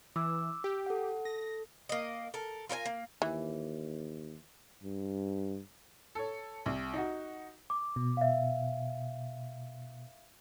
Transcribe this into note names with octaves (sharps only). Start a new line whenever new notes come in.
E3 D6 E6
G4
A4 F#5
A4 A#6
A#3 D#5
A4 A#4
F4 A#4 C5 G#5
A#3
D#2 E3
G2
A4 C#5
C2
D#4 F#4
D6
B2
E5 F5